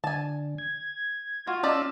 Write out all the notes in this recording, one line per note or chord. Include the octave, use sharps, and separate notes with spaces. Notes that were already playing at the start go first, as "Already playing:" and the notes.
D3 G#5 A5
G#6
F4 F#4
C#4 G4 D5 D#5 A5 E6